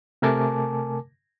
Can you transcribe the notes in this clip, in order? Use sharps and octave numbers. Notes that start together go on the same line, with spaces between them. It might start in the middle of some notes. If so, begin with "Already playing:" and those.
C3 A3 A#4 G#5 A5 D6